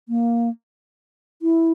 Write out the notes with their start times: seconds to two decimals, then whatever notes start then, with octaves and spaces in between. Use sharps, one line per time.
0.09 A#3
1.42 E4